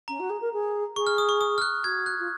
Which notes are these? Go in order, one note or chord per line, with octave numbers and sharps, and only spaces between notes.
C#4 A#5
F#4
G#4
A#4
G#4
G#4 C#6
F6
D#6
C#6
D#6
F6
F#6
F#4 G#6
F#6
F4